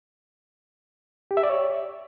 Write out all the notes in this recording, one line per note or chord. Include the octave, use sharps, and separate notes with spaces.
G4
E5
D5
C#5